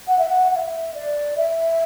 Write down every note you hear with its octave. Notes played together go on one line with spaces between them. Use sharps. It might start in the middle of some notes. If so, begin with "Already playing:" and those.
F#5
E5
F#5
F#5
E5
D5
E5